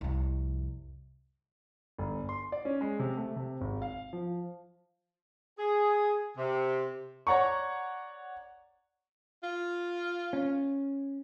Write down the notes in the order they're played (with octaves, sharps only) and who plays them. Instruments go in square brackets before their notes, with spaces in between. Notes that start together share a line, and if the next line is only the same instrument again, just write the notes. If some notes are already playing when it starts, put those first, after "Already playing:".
[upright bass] C2 F2
[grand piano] G1
C6
D5
C#4
G#3
C3
A3
C3
G#1
F5
F3
[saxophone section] G#4
C3
[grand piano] C#5 D5 F#5 A#5 C#6
[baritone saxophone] F4
[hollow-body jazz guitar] C#4